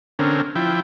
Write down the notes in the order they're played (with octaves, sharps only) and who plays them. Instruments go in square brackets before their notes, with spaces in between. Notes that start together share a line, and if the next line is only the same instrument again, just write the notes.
[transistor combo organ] D3 C4 C#4 A#4
F3 E4 G5